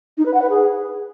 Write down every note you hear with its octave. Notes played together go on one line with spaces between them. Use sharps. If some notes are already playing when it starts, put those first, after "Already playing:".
D#4
B4
F#5
B4
G#4